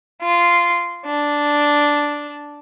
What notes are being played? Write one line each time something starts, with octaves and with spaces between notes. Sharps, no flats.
F4
D4